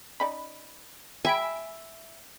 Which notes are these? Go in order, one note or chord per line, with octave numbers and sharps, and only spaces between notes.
C#4 D#4 D5 B5
F#3 G#3 E5 G5 G#5 B5 D7